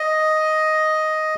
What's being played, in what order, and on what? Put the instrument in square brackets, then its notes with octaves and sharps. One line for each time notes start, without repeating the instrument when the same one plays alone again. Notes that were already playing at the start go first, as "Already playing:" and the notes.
Already playing: [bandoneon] D#5